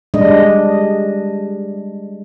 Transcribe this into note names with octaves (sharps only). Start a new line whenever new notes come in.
G3 G#3 D4 D#5